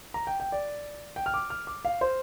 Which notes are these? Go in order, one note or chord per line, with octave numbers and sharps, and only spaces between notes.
A#5
G5
G5
D5
G5
F6
D6
F6
D6
F5
C5